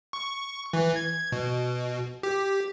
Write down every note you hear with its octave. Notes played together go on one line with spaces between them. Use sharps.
C#6
E3
G#6
B2
G4